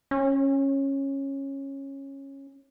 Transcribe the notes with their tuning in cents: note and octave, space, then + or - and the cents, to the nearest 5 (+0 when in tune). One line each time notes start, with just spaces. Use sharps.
C#4 -15